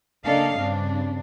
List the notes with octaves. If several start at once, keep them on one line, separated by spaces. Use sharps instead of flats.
C#3 A#3 D4 A4 D#5 F5
G2 C#3 C4 D4